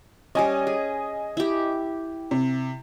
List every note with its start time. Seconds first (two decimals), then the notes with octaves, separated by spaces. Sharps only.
0.35 G3 C#4 D#5 G#5
0.67 G#4
1.37 E4 G4
2.31 C3